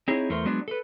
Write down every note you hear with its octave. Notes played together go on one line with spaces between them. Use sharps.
C4 D#4 E4 G#4 C#5
E2 A3 A#4 C5
F#3 G#3 B3 D4
A4 B4